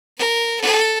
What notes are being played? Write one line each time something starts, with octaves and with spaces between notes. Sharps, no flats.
A#4
A4